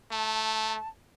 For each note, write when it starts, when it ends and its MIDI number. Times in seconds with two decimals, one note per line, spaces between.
0.11 0.77 57
0.11 0.88 81